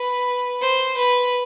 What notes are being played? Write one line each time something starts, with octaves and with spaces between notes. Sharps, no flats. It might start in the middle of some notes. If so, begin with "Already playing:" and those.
Already playing: B4
C5
B4